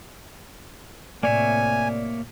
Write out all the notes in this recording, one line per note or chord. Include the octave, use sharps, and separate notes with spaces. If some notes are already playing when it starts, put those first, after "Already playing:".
A2 C3 A#3 C#5 D5 E5 G#5